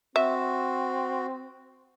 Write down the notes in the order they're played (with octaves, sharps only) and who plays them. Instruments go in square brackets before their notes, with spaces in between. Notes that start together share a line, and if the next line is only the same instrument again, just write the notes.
[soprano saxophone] C4 [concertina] F#4 [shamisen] E5